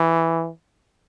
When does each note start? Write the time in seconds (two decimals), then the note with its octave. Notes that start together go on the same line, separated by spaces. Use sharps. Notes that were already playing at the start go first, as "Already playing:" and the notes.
Already playing: E3